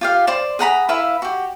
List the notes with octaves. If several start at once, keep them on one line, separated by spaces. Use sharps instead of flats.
F4 G4 F5
C5 D5 C6
G#4 F#5 A#5 B5
E4 B4 E5 F5
F#4 G4